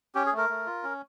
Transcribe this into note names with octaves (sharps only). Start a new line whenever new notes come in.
C#4 G4
G#4
A3
A#4
A3
F4
C#4